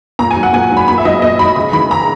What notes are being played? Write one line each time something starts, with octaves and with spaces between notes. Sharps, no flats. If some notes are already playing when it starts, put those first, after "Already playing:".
A#2 A#5
G#5
F#3
F#5
A#2 G#5
F#3
B5
A#2 B5
E5
F#3 D#5
A#2 D#5
F#3 B5
C#3 B5
E3 B5
C#3 A#5